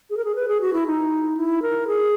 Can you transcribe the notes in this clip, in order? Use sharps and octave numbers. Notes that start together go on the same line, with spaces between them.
G#4
A#4
G#4
B4
G#4
F#4
E4
D#4
E4
A#4
G#4